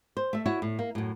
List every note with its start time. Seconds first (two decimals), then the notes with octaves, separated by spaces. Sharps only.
0.17 C5
0.33 A3 E5
0.46 E4 F#4 C#5
0.62 A2
0.79 A#3
0.95 F#2 A2